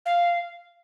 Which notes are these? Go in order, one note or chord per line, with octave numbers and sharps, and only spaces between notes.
F5